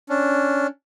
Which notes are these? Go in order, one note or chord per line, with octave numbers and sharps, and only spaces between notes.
C#4 D4